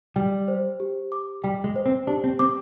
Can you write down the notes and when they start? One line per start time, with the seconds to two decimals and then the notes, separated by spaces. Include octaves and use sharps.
0.16 G3 G5
0.48 C5
0.80 G4
1.12 D6
1.44 G3 G5
1.64 G#3
1.76 C5
1.86 C4
2.07 D4 G4
2.24 C4
2.39 C4 D6